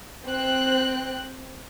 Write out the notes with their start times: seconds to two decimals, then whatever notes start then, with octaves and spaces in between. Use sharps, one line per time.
0.26 C4 G5 F#6